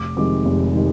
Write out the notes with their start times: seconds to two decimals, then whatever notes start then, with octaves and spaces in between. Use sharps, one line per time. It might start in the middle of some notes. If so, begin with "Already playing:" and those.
Already playing: F1 D6
0.16 F2 C3 D#3 G#3 D6
0.45 F1
0.75 C3 D#3 G#3